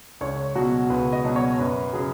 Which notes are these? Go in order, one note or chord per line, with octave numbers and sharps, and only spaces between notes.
C#2 C#5
B2 F#3 F#4
C#2 B4
D#5
B2 F#3
C#5
F#2 B4
C#3 F#3 G#4